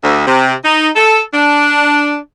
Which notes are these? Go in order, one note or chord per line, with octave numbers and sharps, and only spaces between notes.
D2
C3
D#4
A4
D4